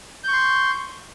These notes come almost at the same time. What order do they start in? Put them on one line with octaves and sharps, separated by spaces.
G6 C#6 C6